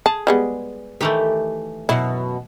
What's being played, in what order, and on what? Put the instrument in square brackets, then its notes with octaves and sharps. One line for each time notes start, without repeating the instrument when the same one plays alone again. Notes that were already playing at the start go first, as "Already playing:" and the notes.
[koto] G#4 [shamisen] A5
[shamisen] G3 G#3 B3
[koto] D#3 E3 A3 [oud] G4
[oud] F#2 B2 [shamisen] E4